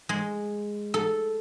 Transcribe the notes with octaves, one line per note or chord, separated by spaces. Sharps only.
G#3
A4